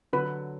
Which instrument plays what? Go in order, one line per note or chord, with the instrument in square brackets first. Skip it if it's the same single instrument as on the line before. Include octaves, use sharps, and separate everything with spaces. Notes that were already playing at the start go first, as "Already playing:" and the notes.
[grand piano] D3 F#3 [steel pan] B4